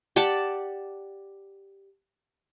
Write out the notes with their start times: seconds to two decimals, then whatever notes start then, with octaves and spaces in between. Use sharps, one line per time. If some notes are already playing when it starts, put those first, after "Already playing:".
0.16 G4 D5 F#5 A5